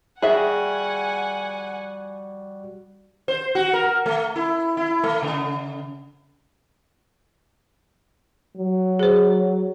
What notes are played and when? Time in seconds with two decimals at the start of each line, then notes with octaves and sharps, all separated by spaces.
0.22 G3 F#4 G#4 E5 F#5 G#5 F#6
3.28 C5
3.55 F#4
3.73 A#4
4.06 A3
4.36 E4
4.77 E4
5.03 A3
5.22 C#3
8.57 F#3
8.99 G#4 C5